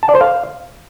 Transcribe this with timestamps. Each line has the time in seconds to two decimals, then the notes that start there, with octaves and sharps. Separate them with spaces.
0.03 A5
0.09 D5
0.15 C5
0.21 F5